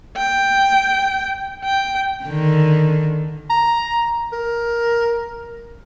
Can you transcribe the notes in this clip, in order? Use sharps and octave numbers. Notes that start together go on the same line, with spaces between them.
G5
G5
D3 D#3
A#5
A#4